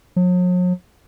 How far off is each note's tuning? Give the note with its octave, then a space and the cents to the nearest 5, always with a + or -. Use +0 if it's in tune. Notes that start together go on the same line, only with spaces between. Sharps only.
F#3 -45